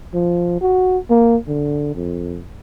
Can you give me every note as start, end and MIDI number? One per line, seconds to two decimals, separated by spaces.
0.14 0.56 53
0.61 0.98 66
1.10 1.36 58
1.48 1.93 50
1.95 2.41 41